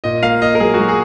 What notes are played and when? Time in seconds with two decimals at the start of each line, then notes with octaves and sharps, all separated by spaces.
0.04 A#2 D#5
0.22 A#3 F5
0.42 A#3 D#5
0.55 A#4
0.60 F#3 G#4
0.74 F#4
0.79 F#3
0.88 G#4